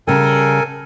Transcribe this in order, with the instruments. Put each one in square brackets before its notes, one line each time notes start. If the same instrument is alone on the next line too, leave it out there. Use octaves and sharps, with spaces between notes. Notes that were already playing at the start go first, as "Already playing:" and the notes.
[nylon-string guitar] C#3 G3 [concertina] A4 A#4 G#5